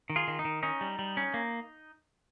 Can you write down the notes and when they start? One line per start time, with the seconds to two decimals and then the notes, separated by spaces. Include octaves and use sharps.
0.10 D#3
0.16 F4 G#4
0.28 D#3
0.39 D#4
0.45 D#3
0.63 C#4 D#4
0.81 G3
0.99 G3
1.17 C#4
1.34 A#3